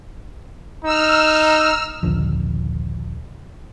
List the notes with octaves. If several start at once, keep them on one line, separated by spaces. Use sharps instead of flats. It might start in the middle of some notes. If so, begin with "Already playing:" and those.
D#4 E6 F6
A#1 D#2 D3 F3